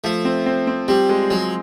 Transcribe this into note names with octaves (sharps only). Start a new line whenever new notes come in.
F3 A3
C4
C4
C4
G3 C4
G#3
F#3 G#3